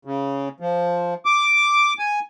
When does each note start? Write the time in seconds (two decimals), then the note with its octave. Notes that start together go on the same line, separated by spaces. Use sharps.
0.05 C#3
0.60 F3
1.25 D6
1.99 G#5